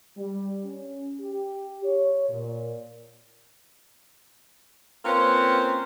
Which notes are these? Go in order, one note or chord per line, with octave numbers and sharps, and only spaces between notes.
G3
C#4
G4
C#5
A#2
A#3 C4 C#4 F4 B4 C5